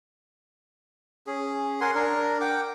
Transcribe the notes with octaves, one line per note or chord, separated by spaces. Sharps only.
C#4 G#4
A#4 F#5 G#5 C6
D4 A#4
F#5 G5 D6